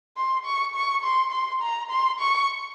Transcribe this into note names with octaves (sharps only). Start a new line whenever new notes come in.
C6
C#6
C#6
C6
C6
A#5
C6
C#6